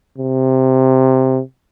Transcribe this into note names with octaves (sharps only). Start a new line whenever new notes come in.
C3